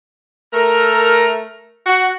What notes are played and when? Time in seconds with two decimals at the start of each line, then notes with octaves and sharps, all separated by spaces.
0.54 A3 A#4
1.87 F#4